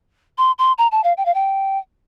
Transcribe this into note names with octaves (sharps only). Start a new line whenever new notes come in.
C6
C6
A#5
A5
F5
G5
F5
G5